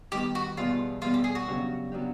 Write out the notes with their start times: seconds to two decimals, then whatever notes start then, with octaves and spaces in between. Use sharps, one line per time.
0.12 D#3 G3 B3 G4
0.35 F#4
0.57 E2 B2 G3 B3 F4
1.02 E2 B2 G3 B3 F4
1.14 G4
1.24 G#4
1.35 F#4
1.47 C#3 F#3 B3 D4 G4
1.92 C#3 F#3 B3 D4 G4